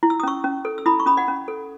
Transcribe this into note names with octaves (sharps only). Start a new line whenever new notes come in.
E4
E6
D#6
C#4 C#6 E6
C#4
A4
E6
E4 B5 D#6
C#6
C#4 B5 D#6
D#5 F#5
C#4
A4